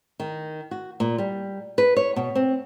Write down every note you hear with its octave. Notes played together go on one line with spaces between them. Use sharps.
D#3
F#4
A#2
G3
B4
C#5
B2
C4